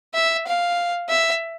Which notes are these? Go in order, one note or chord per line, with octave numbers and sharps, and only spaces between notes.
E5
F5
E5